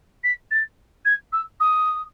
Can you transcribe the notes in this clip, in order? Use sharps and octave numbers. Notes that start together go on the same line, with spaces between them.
B6
A6
G#6
E6
D#6